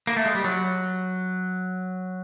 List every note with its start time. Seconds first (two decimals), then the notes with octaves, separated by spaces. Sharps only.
0.07 A#3
0.16 A3
0.26 G#3
0.35 G3
0.44 F#3